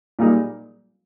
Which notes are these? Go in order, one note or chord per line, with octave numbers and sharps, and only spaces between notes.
A#2 G3 A#3 D#4 G#4